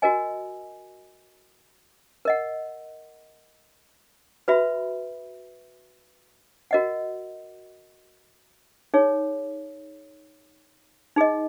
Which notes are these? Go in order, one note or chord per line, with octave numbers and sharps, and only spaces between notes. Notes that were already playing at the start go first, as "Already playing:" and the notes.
F#4 A#4 D#5 G#5
A#4 D#5 F#5
F#4 B4 E5 B5
F#4 A#4 D#5 F#5
D#4 G#4 C#5
D#4 G#4 D#5